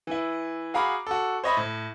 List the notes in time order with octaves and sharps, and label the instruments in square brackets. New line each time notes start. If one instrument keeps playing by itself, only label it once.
[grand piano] E3 E4
F#4 G#4 F5 A#5 B5 D6
F#4 A4
C5 C#5 D#5 E5 B5
A2